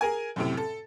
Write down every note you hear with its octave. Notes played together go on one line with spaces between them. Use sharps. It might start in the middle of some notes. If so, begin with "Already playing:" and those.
G#4 A#4 G#5
F#2 A2 C3
A4